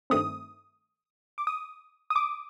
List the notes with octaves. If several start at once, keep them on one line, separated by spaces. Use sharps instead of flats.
G2 D#3 A3 C4 D#6
D6
D#6
D#6
D6